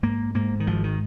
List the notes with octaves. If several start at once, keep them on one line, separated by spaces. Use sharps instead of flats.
G#2 A#3
G#2 A#3
D#3
G#1 F3
D#3